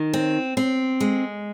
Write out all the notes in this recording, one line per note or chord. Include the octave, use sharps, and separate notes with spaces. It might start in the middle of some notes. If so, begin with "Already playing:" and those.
Already playing: D#3
C4
C4
G#3